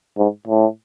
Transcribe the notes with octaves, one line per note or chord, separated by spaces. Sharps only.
G#2
A2